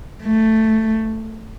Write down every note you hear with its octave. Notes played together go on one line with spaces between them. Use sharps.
A3